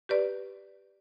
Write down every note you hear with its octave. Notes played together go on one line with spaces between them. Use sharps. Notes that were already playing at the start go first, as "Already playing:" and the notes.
G4 B4 D5